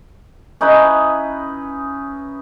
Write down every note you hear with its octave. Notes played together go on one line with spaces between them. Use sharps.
C#4 D#4 E4 B4